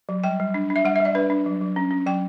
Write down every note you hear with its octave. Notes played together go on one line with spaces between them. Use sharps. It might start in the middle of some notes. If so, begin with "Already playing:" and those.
F#3
G3 G5
G3
D4
D4
E5
G3 F#5
E5
G3
D5
D4 B4
D4
F#3
F#3
C#4
C#4
F#3 G5